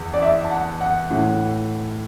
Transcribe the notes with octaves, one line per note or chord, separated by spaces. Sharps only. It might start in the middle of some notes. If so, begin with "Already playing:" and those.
Already playing: E2 E3
D5
E5
A5
F#5
F#5
A2 E3